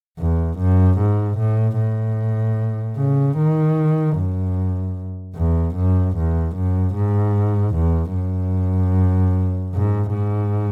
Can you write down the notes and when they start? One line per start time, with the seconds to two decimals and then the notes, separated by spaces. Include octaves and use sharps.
0.19 E2
0.58 F#2
0.98 G#2
1.38 A2
1.78 A2
2.97 C#3
3.37 D#3
4.17 F#2
5.36 E2
5.75 F#2
6.16 E2
6.55 F#2
6.95 G#2
7.75 E2
8.14 F#2
9.74 G#2
10.14 G#2